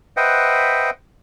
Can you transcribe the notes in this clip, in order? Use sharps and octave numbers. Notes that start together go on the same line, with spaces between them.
B4 C5 D#5 E5 F#5 G5